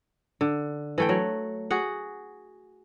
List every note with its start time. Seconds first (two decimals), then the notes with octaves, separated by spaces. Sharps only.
0.41 D3
0.98 E3 A3 G5
1.09 F#3
1.70 F#4 G#4 F#5